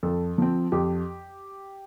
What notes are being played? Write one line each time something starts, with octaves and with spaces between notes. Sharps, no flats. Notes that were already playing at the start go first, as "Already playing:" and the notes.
F2 A4
F3 C4
F2 G4